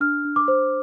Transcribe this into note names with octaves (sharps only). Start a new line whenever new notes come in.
D4 F6
D4
D6
C5